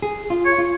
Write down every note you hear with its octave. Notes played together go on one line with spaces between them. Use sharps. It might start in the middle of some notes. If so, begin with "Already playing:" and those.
G#4
F4
C#5
F4